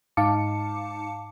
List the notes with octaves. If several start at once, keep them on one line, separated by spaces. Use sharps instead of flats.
G#2 D#4 F5 A5 D6 C#7